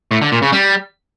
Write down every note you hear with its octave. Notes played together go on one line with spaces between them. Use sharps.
A2
D3
A#2
C#3
G3